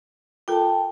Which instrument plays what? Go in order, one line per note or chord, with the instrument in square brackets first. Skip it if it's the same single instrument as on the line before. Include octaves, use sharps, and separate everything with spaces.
[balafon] F4 A4 A#4 [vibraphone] G5 A5